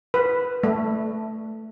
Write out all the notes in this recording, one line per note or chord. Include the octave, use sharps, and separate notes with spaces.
B4
A3